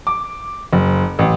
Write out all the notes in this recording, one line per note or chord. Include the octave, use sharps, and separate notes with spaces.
D6
F#1
A1